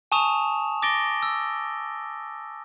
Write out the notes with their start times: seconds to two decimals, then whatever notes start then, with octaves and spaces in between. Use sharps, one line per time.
0.12 G#5 A5 C#6 D#6 E7 F7
0.82 D6 A6 A#6 D7 G7
1.23 E6